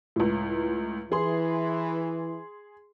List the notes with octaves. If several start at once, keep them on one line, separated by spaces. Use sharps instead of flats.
C#2 A2
E3 G#4 C6